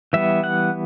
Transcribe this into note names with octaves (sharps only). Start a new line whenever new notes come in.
E3 G3 B3 E5
F#5